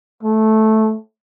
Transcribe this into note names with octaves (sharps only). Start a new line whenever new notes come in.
A3